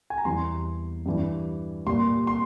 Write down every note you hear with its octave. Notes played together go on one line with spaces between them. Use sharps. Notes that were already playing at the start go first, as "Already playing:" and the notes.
G#5
A#5
E2 E3 G3 C6
G2 E3 G3
A#2 G3 C6
C6